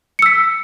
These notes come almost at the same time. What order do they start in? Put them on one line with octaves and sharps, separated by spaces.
C#7 E6 B6